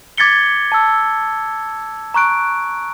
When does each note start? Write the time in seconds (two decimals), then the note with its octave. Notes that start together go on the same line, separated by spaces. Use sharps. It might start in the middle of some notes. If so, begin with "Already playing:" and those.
0.18 D6 G#6 A6 B6 C#7 G7
0.72 A5 E6
2.14 A#5 C#6 F#6 D7